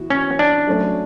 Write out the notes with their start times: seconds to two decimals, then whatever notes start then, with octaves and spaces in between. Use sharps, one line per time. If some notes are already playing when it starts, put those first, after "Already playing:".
Already playing: E3 B3 F#4
0.10 C#4
0.39 D4
0.67 F#3 A3 C#4